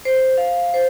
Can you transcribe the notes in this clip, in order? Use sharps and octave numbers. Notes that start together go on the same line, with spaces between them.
C5
F5
C5